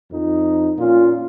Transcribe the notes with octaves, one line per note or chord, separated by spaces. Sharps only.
F2 D#4
A#2 C#4 F4